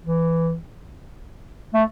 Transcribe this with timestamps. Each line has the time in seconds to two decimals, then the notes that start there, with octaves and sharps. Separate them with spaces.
0.05 E3
1.74 A3